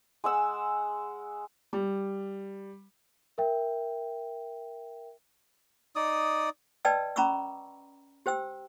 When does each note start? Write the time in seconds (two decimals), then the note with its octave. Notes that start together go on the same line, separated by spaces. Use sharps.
0.24 G#3 F#5 E6
1.73 G3
3.38 A#4 E5 G5
5.96 D#4 D5 D#6
6.85 B4 D5 D#5 G5 A5 E6
7.16 C#4 A#5 B5 C#6 D6 E6
8.26 G4 C5 G5 E6